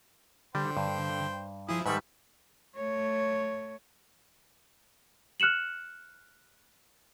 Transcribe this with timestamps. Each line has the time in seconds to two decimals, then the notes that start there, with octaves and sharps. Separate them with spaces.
0.55 D3 G3 C5 G5
0.77 G2
1.69 F3 E4 G#4 D#6
1.86 G#2 D#3 G3 A4 B4 E5 B5
2.76 A3 C#5
5.40 F6 F#6 C#7 E7 F#7